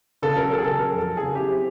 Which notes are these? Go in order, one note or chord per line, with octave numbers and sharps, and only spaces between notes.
C#3 A4
F#3 A#4
F#3 A4
G#4
C#3 A4
F#3 A#4
F2 A4
F#3
C#3 G#4
E4 G4
C4